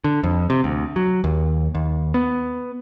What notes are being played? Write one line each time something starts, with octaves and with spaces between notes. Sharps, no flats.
D3
F2
C3
D2
F#3
D#2
D#2
B3